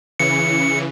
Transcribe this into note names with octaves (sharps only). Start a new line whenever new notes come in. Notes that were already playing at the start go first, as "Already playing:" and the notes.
C#3 E3 C#7